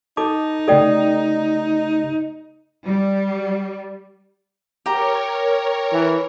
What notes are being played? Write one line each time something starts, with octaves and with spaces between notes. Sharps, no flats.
D#4 A4 A5 D6
C#3 A3 G4 A4 D5 G5
G3
G4 A#4 C#5 A#5
E3